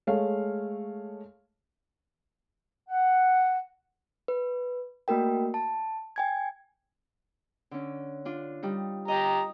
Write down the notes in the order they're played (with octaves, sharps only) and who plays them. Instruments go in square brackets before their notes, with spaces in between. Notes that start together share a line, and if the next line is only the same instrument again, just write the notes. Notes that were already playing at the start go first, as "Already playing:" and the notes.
[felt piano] G#3 A3 C#5 F5
[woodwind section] F#5
[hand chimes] B4
A3 A#3 F#4 A#4 G5
A5
G5 G#5 G#6
[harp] D3 C#4
D4 F4
G3 D#4
[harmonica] G4 A#5 [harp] D#5